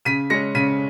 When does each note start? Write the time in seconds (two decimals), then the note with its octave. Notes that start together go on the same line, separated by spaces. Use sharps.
0.05 C#3 B6 D#7
0.30 G#3 C#4 A#6 C#7
0.55 C#3 B6 D#7